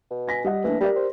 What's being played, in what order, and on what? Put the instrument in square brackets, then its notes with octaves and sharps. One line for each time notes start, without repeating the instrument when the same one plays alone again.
[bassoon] B2
[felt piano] G#5 A#6 B6
G3 D#5 F#5
[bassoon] E3 [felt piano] A3 A#3 D4
[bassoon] G3 [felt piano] G4 A#4 D5
[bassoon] C5